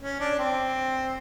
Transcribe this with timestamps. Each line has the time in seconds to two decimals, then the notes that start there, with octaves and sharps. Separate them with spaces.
0.02 C#4
0.20 D4
0.39 C4